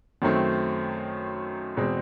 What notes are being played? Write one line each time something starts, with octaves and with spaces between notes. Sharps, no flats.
F#2 D#3 F#3 A3 C4
E2 B2 G#3 C4